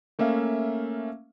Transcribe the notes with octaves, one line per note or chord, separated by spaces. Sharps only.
A3 A#3 C#4 E5 F5